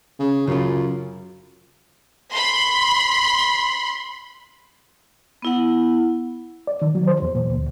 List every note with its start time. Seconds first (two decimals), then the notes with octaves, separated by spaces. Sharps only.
0.19 C#3
0.47 F#2 C#3 F4
2.31 B5 C6
5.42 B3 E4 F#5
6.67 D5
6.82 D#3
6.95 F#3
7.07 C5
7.22 E2
7.35 A#2
7.50 D2